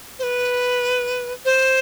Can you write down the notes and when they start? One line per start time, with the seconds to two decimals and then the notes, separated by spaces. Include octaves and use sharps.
0.19 C5
0.23 B4
1.45 C5